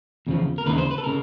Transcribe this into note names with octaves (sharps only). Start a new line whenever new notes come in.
E2 C#3 F3
A#4
D#2 C#3 E3 B4
C5
B4
A4
C#3 A#4